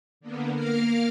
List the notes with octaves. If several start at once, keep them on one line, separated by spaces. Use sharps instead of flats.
D3 A#3 B3
A#3 A#4 F5 F6